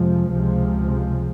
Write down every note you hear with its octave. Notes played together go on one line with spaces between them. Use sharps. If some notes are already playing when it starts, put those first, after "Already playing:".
Already playing: F2 C3 F3 G#3
C#2 C3 F3 G#3